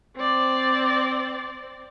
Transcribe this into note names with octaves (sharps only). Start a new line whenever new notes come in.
C4 D5